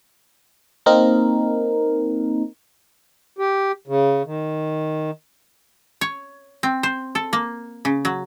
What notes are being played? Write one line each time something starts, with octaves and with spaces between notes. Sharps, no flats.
A#3 C4 D#4 A#4
G4
C#3
D#3
C#5
C4
C5
A4
A#3
C#3
F#3